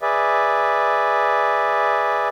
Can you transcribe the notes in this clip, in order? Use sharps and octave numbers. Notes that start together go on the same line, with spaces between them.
G#4 B4 D5 E5